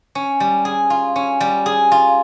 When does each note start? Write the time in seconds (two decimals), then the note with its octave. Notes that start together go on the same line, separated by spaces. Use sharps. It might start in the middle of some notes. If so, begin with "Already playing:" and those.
0.15 C#4
0.40 G3
0.65 G#4
0.90 F4
1.16 C#4
1.41 G3
1.66 G#4
1.92 F4